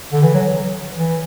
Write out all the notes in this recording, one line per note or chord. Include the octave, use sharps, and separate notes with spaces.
D3
E3
F#3
E3